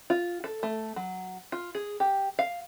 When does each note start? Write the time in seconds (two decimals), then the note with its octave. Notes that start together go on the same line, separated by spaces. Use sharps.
0.10 F4
0.44 A4
0.63 A3
0.96 F#3
1.52 F4
1.75 G#4
2.00 G4
2.39 F5